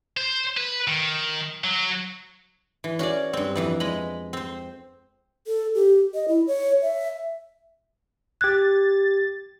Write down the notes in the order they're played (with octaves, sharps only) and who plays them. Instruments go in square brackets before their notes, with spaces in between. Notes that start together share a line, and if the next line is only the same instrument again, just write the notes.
[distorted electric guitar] C5
B4
D#3
F#3
[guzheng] E3
C#4 F#4 G#4 D5
G2 C4
F2 E3 B3
G#3 D#5 B5
C4 C5
[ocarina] A4
G4
D#5
E4
C#5
E5
[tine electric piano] G4 G#6 [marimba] F#6 [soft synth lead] A6